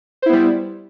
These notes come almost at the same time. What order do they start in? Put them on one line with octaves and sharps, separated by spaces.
C5 E4 B3 G3